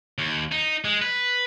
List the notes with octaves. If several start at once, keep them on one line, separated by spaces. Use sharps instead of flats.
D#2
D#4
G#3
B4